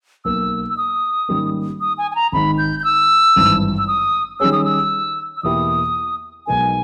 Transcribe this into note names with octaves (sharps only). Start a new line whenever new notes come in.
B1 B2 A#3 E6
E6
D#6
G#2 D#3 G3 A#3 C#4
D#6
G#5
G#5
A#5
G#1 G#2 D#3 B5
G6
G6
E6
G#1 G2 E3
E6
D#6
D#3 G3 C#4 G#4 C#5 E6
D#6
E6
E6
E2 B2 A#3 E4 G4 D#6
B1 B2 G#3 D#4 A#4 G#5